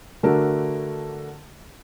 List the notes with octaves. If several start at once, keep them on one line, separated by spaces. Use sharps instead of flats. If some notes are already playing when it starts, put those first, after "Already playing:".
D3 A3 D4 F#4 A#4